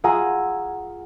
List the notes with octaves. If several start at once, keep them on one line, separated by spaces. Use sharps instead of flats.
F4 G#4 F#5 G#5 A#5 E6